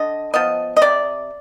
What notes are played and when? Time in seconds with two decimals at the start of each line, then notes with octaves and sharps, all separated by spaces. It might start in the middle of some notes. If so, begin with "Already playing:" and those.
Already playing: D3 D#5
0.34 F3 B3 D#5
0.77 D#5
0.82 C3 D5